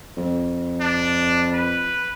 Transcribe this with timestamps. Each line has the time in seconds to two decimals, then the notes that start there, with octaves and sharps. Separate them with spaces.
0.17 F2
0.81 D4
1.53 B4